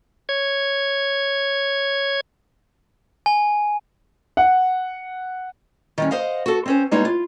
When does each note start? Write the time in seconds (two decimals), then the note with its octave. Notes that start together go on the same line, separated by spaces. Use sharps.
0.29 C#5 G#6
3.26 G#5
4.37 F#5
5.98 D#3 G3 C#4
6.11 C5 D#5 F5 F#5
6.46 F#4 A4
6.66 C4 C#4 C5
6.91 G3 G#3 A#3 B3 D#4 C#5
7.05 F4